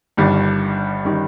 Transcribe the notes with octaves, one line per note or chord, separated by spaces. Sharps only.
G1 G2 D#3 G3
D#3 G3